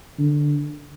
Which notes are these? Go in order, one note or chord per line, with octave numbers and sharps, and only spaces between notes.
D3